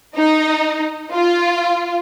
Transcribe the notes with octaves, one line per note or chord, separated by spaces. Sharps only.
D#4
F4